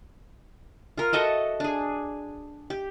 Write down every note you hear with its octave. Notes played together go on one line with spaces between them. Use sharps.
F4 A#4
F#4 A4 D#5 E5
D4 G#4
G4